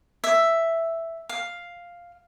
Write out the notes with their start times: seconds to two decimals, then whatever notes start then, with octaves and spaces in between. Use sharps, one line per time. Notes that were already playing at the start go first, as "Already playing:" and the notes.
0.24 E5
1.29 F5